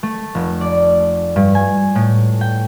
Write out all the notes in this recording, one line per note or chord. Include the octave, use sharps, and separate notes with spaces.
A3
F1
D5
G2
G#5
A2
G5